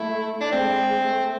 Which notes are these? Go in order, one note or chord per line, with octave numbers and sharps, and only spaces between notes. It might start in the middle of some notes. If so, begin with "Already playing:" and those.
Already playing: A3 E4
D4
G#3 C4
A3